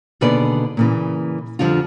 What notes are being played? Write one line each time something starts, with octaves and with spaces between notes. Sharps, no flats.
D#2 B2 D3 G#4 B4 D5
A#2 C#3 E3
F2 D3 F3 G3 F4